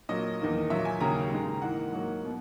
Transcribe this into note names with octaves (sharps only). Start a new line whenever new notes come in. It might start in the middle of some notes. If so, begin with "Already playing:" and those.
A#2 F#3 A#3 D#5
E2 D#3 A#3
A#2 F#3 A#3 E5
G#5
D#2 C#3 F#3 A#3 A#5
G#2 D#3 G#3
G#2 E3 A#3 F#5
G#2 F#3 A#3
B2